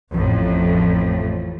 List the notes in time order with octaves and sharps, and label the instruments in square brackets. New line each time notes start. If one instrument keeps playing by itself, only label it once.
[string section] A1 F2 A2